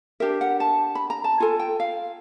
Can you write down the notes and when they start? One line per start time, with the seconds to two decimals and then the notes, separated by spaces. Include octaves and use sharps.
0.20 D4 G4 A#4 E5
0.41 F#5
0.60 A5
0.95 B5
1.10 A#5
1.24 A5
1.40 F4 A4 G#5
1.60 G5
1.80 F5